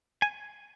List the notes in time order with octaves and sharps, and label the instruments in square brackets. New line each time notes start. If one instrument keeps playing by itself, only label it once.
[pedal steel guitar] G#5